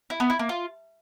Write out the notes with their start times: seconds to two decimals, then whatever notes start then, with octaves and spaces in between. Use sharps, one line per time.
0.10 E4
0.20 B3
0.30 E4
0.39 A#3
0.49 F4